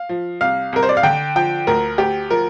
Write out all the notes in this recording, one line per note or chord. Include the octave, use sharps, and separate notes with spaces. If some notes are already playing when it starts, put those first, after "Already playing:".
Already playing: F5
F3
C2 F5
C2 A#4
C5
D5
F5
D3 G5
F3 G5
D2 A#4
D2 G4
F3 A#4